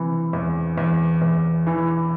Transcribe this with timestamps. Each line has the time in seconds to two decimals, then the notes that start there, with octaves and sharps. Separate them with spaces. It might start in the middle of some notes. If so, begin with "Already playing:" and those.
Already playing: C3 E3
0.33 E2
0.78 E2
1.22 E2
1.67 E3